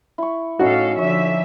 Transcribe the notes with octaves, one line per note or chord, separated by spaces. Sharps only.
E4 C#6
A2 C#4 D#4 F#4 A4 F5
D3 F3 C#5 E5